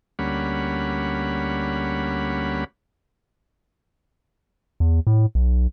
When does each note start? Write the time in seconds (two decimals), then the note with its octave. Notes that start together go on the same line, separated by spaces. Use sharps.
0.19 D2 G3 A#3 C#4 F#5 B5
4.80 E2
5.07 A2
5.35 B1